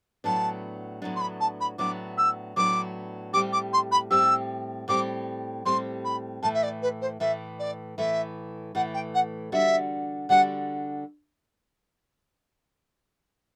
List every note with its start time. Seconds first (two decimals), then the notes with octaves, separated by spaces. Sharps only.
0.24 A2 F#3 B3 D4 A5
1.02 A2 F#3 B3 D4
1.15 C6
1.20 B5
1.40 A5
1.60 B5
1.78 A2 F#3 B3 D4 D6
2.17 E6
2.56 A2 F#3 B3 D4 D6
3.33 A2 G3 C4 G4 D6
3.52 D6
3.73 C6
3.91 B5
4.10 A2 G3 C4 G4 E6
4.88 A2 G3 C4 G4 D6
5.65 A2 G3 C4 G4 C6
6.04 B5
6.42 A2 E3 A3 A5
6.54 E5
6.63 D5
6.82 B4
7.01 C5
7.20 A2 E3 A3 E5
7.59 D5
7.97 A2 E3 A3 E5
8.75 A2 E3 A3 F#5
8.94 G5
9.14 F#5
9.52 D3 G3 D4 F#4 E5
10.29 D3 G3 D4 F#4 F#5